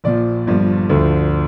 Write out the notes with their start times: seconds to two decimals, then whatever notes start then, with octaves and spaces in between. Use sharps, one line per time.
0.04 A#1 A#2 F3 D5
0.46 G1 G2 F3
0.89 D2 D3 F3